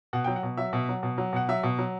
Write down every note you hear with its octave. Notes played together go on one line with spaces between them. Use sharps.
B2 F#5
F#3 G5
F#5
B2
F#3 E5
B2
F#3
B2
F#3
B2 F#5
F#3 E5
B2
F#3